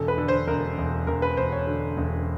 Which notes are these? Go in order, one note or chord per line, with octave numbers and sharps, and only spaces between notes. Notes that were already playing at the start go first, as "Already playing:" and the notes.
Already playing: E1 A4
B4
D3
C5
E1 A#4
E1
E1 A#4
B4
E1 C5
C#5
D3
E1